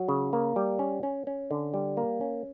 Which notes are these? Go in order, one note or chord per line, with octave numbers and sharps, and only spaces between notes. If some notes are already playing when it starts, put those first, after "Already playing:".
Already playing: F#3
C#3
A#3
G3
C#4
C#4
C#4
D3
G3
A#3
C#4